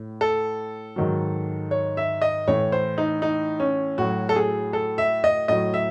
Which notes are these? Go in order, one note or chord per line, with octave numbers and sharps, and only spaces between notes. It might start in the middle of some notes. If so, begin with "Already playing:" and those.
Already playing: A2
A4
G#2 D#3 F#3
C#5
E5
D#5
A2 E3 C#5
C5
D#4
D#4
C#4
A2 F#3 F#4
A4
G#4
A4
E5
D#5
A2 F#3 D#5
E5